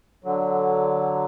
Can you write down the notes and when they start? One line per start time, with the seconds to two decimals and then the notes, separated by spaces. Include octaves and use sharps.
0.24 D3 F#3